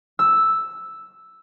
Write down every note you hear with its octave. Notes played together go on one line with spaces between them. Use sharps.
E6